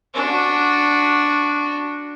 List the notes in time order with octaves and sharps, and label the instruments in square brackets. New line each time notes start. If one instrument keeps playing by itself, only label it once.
[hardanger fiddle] D4 F#4